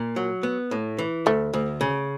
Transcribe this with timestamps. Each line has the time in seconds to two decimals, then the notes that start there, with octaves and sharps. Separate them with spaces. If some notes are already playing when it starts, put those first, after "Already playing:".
Already playing: A#2
0.16 F#3
0.43 B3
0.71 A2
0.98 E3
1.26 D2 A3
1.53 D2
1.81 C#3